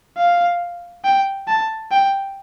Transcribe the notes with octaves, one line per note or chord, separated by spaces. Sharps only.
F5
G5
A5
G5